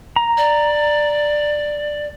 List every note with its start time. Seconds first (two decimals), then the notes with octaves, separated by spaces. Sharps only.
0.16 A#5
0.37 D5